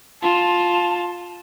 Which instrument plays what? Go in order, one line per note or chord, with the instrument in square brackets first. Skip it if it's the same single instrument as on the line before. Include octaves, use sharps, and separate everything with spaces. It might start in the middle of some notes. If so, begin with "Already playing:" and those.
[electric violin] F4 [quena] A5